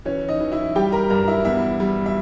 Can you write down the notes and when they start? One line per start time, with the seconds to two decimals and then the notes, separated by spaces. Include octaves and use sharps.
0.05 E3 C#4 C#5
0.29 D#4 D#5
0.40 E3
0.52 E4 E5
0.75 G3 G4 G5
0.92 A#4 A#5
1.10 G2 A#4 A#5
1.28 E4 E5
1.45 E2 E4 E5
1.80 G3
2.06 E5